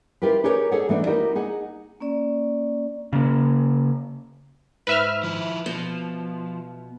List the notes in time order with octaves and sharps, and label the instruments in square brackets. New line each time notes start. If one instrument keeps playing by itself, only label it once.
[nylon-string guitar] E4 F4 G4 A#4 B4
D#4 G4 G#4 A#4 B4 C#5
G#4 A4 C#5 F#5
E3 A3 A#3 D4 D#4
D#4 E4 F#4 G4 A#4
D#4 G#4 F#5
[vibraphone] A#3 C#4 D5
[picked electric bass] C#3 A#3
[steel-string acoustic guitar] G#2 [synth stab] B4 E5 F6
[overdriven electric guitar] F3 E4
[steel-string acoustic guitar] B2 [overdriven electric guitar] F3